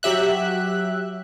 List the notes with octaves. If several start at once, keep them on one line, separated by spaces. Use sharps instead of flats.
F#3 G4 E5 F#6